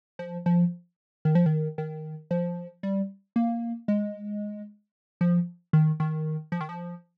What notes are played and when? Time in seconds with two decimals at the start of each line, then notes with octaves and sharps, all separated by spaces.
0.19 F3
0.46 F3
1.25 D#3
1.35 F3
1.46 D#3
1.78 D#3
2.31 F3
2.83 G3
3.36 A#3
3.88 G#3
5.21 F3
5.73 D#3
6.00 D#3
6.52 F3
6.61 D#3
6.69 F3